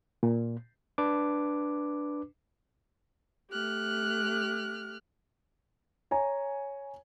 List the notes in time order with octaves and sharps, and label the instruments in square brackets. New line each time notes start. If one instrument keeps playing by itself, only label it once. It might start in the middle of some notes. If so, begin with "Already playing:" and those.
[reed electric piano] A#2
[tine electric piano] D4 B4 D6
[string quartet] A3 G4 F6 F#6
[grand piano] C#5 G#5 A#5